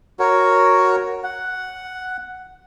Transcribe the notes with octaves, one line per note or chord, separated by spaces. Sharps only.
F#4 A#4 C#5
F#5